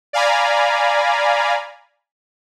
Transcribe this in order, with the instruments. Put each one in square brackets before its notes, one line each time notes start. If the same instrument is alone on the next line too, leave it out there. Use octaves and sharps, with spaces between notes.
[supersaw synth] D5 F5 G#5 A#5 B5